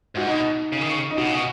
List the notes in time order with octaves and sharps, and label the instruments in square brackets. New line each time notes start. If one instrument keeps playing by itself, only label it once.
[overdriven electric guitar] G#2 [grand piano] F#4
[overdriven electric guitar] B2 [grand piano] D#4
[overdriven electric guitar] C#3
D#3
C#3
[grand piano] D#4
[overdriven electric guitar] B2 [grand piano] F#4
[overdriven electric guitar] C#3
B2